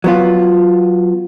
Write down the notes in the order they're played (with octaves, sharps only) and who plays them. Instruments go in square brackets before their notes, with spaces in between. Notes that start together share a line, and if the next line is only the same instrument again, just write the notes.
[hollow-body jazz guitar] F#3 B3 F4